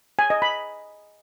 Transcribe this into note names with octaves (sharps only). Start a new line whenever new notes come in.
G#5
D#5
B5